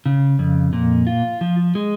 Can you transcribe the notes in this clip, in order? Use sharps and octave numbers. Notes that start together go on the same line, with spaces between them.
C#3
F2
A#2
F4
F3
G#3